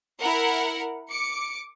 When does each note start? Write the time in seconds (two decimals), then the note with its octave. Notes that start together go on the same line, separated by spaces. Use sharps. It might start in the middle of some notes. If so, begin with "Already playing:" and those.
0.20 E4 A#4 F#5
1.09 D6 C#7